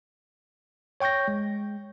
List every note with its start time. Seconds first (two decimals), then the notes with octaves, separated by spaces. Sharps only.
1.00 C#5 G5 C#6 G6 A#6
1.28 G#3